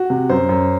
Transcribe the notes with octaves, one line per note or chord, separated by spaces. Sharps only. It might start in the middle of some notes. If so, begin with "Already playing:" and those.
Already playing: F#4
C3
F#2 C5
F#2